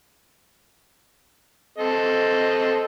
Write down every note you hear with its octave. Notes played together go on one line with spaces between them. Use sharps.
C4 A4 D#5